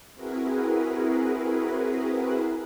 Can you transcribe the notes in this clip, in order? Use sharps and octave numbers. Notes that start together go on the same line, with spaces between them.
C4 E4 F#4 G#4 A#4 B4